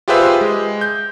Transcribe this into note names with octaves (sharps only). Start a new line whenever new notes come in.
F4 G4 G#4 B4 C5 E5
G#3
G6